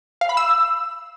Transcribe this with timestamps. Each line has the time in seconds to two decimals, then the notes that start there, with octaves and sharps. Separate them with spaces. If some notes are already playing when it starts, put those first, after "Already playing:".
0.21 F5
0.29 B5
0.37 E6